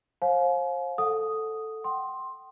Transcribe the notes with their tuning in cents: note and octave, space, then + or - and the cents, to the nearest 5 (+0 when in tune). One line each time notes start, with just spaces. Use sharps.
C5 +35 F5 +25 G#5 +40
A4 +0 F#5 -20 D#6 +0
G5 -35 C6 +10